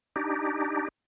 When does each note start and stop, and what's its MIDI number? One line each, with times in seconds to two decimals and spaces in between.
0.16 0.88 62
0.16 0.88 63
0.16 0.88 67